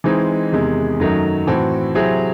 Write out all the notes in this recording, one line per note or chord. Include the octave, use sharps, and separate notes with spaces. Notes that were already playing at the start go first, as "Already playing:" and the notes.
E3 G#3 C4 D#4
E2 C3 D#3 G#3
F#2 D#3 F#3 A3 D#4
A2 E3 C4 F#4 A4
C3 F#3 C4 E4 G#4